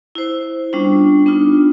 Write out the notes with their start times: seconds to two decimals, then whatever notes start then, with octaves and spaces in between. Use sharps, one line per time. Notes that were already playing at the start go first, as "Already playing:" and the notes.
0.15 E4 C5
0.73 G3 B3 C#4 D4 F4
1.26 B3 D4 D#4 F4